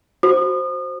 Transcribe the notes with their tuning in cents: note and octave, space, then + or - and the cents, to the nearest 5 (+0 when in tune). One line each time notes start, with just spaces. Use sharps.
F#4 +0 C5 +10 D#6 -35